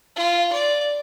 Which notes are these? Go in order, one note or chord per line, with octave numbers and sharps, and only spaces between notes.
F4
D5